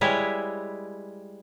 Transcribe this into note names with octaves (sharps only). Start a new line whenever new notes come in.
G3 G#3 E4 B4 C#5